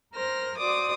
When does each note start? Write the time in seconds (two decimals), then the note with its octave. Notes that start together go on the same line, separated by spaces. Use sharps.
0.12 A#4 C5 F6 A#6
0.57 F#4 C5 D5 D6 D#6